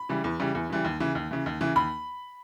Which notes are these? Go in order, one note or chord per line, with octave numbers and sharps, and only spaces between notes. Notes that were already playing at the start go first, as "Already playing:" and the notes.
Already playing: B5
C#3 E3 G3
E2
C#3 E3 G3
E2
C#3 E3 G3
D#2
C#3 E3
D#2
C#3 E3
D#2
C#3 E3
D#2 B5